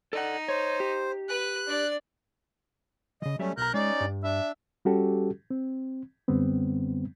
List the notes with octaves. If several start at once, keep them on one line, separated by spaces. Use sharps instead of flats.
D#4 A4 D5 F#5
C5 C#5
G4
B4 F#6
D4 D5
C#3 E3 D#5
F#3 G3 A3 C#4 E5
B1 A#4 A#5 F#6 G6
G#3 C#4 D#4 D5
G2
D4 E5
G3 C#4 F#4 G4 A4
C4
F#2 D3 G3 B3 C4